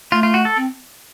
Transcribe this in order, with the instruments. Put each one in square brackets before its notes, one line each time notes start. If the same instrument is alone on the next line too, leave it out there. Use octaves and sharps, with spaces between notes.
[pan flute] A3 [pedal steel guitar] F4
[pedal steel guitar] F4
F#4
A4
[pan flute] C4